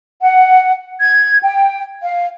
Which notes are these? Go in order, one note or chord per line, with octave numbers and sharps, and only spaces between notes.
F#5
G#6
G5
F5